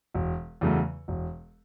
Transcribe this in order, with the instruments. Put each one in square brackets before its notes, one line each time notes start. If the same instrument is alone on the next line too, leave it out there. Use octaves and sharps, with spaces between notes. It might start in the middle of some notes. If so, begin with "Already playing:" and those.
[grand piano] E1
E2 C#3 F#3 A3
E1